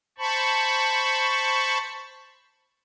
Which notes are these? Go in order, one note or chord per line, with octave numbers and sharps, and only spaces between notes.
C5 A5 B5 C#6